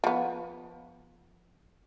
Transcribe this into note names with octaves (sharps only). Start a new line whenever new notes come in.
F3 B3